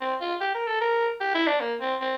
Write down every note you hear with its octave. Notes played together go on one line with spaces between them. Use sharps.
C4
F4
G4
A#4
A4
A#4
G4
E4
D4
A#3
C4
C4